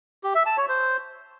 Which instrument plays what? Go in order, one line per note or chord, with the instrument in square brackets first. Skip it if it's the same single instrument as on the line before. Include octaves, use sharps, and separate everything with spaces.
[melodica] G4
E5
A5
C#5
C5